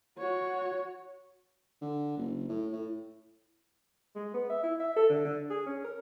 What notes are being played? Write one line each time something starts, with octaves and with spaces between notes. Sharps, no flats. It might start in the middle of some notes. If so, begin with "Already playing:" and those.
F#4 C#5
D3
F#1
A2
A2
G#3
B3
E5
E4
E5
A4
D3
D3
G#4
C#4
A#4